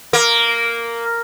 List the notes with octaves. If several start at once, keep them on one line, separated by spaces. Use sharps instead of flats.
A#3